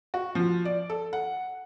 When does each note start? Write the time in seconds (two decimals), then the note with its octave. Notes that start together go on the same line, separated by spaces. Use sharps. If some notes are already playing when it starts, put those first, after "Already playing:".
0.14 F#4
0.35 F3
0.65 D5
0.90 A4
1.13 F#5